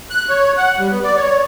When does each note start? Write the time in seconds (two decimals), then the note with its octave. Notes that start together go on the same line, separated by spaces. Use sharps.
0.10 F#6
0.29 C#5
0.57 F#5
0.79 G3
0.91 B3
1.04 D5
1.16 C#5